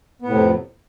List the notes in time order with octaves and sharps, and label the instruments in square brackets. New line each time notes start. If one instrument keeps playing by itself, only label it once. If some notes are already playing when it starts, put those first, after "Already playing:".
[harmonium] B3
A2
C3
F2